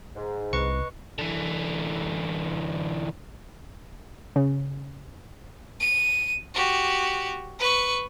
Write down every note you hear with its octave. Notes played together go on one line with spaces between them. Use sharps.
G#2
C2 B4 D#5 C#6 C#7
D3 E3
C#3
D#7
F#4 G4
B4 C#6